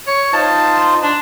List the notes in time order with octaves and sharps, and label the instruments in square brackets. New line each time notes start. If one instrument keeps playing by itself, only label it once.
[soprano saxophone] C#5
[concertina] D#4 F4 C5 [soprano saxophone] A5
[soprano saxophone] D4